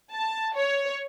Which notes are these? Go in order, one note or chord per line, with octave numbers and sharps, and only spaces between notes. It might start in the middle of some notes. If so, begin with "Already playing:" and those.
A5
C#5